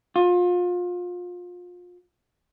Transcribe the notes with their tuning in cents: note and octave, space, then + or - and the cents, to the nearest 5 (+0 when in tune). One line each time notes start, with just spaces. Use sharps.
F4 +30